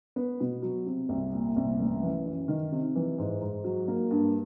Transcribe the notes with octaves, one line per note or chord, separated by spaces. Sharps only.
B3
B2
F#3
C3
C2
A#2
C2
A1
E3
F#2
D#3
C3
E3
G#2
G#2
F#3
A#3
G2